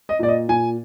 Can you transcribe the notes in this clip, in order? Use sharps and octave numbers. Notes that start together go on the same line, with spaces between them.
D#5
A#2 D5
D#5
A#2 G#5